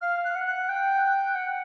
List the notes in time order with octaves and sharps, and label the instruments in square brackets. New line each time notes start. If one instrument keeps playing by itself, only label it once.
[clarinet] F5 [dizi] F6
[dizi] F#6
[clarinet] F#5
[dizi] F#6
[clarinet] G5
F#5